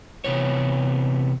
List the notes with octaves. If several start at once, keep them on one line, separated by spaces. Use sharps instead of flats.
C3 E3 B3 C#5